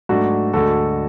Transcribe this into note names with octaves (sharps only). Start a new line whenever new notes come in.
G#2 F#3 A3 D4 F#4
D2 D3 G#3 F#4 A4